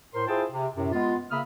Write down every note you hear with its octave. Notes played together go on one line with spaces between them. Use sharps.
A2 A#4 C5 C6
E4 F4 G#4 C5 G5 A5
C3
F#2 A2 C3
G#3 B3 F4
C#3 A#3 E5 B5 D#6 F6